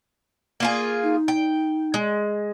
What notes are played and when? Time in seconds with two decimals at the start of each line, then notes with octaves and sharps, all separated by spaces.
0.60 A#3 F4 G#4
1.03 D#4
1.28 G5
1.94 G#3